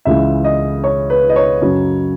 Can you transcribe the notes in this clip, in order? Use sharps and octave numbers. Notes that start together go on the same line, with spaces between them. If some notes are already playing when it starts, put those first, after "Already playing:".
C#2 C#3 E3 G#3 E5
D#5
C#5
B4
D#5
C#5
F#2 C#3 F#3